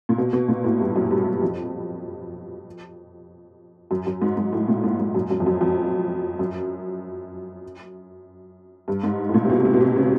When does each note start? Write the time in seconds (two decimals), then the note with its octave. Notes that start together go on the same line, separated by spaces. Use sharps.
0.09 A#2
0.18 B2
0.33 B2
0.48 A#2
0.64 A2
0.80 G2
0.96 F#2
1.11 G2
1.26 F#2
1.42 F2
3.91 F#2
4.06 F#2
4.22 G#2
4.37 G#2
4.53 A2
4.68 A#2
4.84 G#2
5.00 G#2
5.15 F#2
5.31 F#2
5.40 F2
5.46 F#2
5.61 F2
6.39 F#2
8.88 G2
9.03 G#2
9.29 A2
9.34 A#2
9.45 C3
9.49 B2
9.60 B2
9.65 C3
9.74 B2
9.81 C3
9.96 C#3